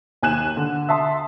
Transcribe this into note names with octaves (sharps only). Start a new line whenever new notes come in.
D#2 G#5 F#6 E7
D3
E5 A5 C6 D#6